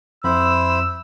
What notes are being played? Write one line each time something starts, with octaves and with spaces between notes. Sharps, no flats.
F2 E4 C5 B5 E6